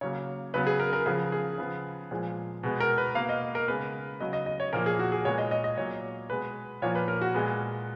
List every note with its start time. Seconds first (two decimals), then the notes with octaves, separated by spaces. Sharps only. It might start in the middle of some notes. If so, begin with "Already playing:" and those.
0.01 C#3 F#3 A#3 C#5
0.54 C#3 F#3 B3 B4
0.67 G#4
0.80 A#4
0.93 A#4
1.06 C#3 F3 B3 G#4
1.32 G#4
1.58 C#3 F3 B3
2.11 A#2 F3 G#3
2.63 B2 G#3 B3
2.80 A#4
2.98 B4
3.15 B2 A#3 F5
3.29 D#5
3.55 A#4
3.68 C#3 G#3 B3 B4
4.20 C#3 F#3 B3 D#5
4.33 D#5
4.46 D#5
4.60 C#5
4.73 A#2 F3 A#3 A#4
4.86 G#4
4.99 F#4
5.12 G#4
5.25 A#2 G#3 B3 C#5
5.38 D#5
5.51 D#5
5.64 D#5
5.77 A#2 F#3 A#3 C#5
6.30 B2 G#3 B3 B4
6.82 A#2 F3 A#3 C#5
6.95 B4
7.08 A#4
7.21 F#4
7.34 A#2 G#3 B3